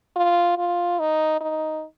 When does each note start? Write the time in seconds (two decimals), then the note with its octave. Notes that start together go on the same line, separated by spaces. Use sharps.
0.16 F4
0.58 F4
0.99 D#4
1.41 D#4